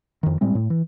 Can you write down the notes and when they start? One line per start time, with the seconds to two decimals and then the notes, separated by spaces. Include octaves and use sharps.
0.23 F2 D#3
0.41 A2 G3 G#3 C4
0.55 A2
0.70 E3